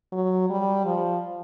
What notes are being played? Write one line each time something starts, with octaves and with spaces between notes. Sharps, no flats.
F#3
G3
F3